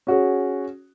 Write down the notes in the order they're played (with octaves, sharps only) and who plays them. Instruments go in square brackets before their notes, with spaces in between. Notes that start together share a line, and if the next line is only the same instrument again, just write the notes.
[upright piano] C#4 F#4 G#4